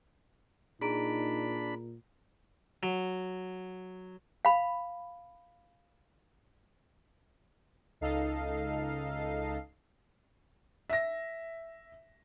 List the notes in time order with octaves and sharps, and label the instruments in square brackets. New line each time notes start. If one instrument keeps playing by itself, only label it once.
[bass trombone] A#2 [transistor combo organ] D4 B5 [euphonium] D#4 [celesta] G#4 A#5 D7
[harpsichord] F#3
[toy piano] F5 B5
[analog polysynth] C#2 D#4 A4 D#5 F5 C7
[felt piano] E5 A#6